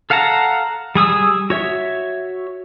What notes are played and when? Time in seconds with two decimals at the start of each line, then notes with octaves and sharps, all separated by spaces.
0.10 A4 F5 F#5 A5 A#5
0.95 G3 G#4 D#6 E6
1.50 F#4 C#5 E5